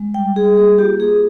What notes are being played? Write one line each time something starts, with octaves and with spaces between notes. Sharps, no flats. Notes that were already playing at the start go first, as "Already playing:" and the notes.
Already playing: G#3
G3 G5
G3 G#4
A#3 G#4
F4 G4
A#3 G#4